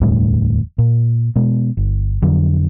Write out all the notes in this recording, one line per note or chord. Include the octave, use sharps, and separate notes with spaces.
E1 D2 A2 G3
A#2
B2 G#3
G1
F2 D3 F#3